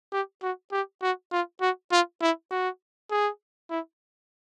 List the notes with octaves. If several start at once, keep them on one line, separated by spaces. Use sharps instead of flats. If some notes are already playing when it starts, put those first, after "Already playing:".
G4
F#4
G4
F#4
F4
F#4
F4
E4
F#4
G#4
E4